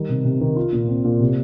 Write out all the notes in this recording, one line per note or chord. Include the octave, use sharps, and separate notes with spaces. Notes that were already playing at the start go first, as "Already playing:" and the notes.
Already playing: D#3 G3
C3
C3
D#3
F4
A#2
C4
A#2
C3